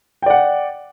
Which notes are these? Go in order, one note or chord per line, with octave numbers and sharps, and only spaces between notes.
D5 F#5 G5